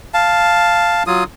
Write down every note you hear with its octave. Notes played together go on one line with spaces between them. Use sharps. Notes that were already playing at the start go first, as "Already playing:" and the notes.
F5 A5
F#3 F4 D#6